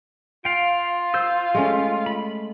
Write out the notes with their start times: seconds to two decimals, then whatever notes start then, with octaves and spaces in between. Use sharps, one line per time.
0.45 F4 F5 G5
1.14 C5 E6 G6
1.54 G#3 A3 C#4
2.06 B5